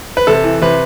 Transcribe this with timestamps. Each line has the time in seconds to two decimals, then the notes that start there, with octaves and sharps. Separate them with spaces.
0.17 B4
0.27 C3 A4
0.44 E3
0.62 C3 B4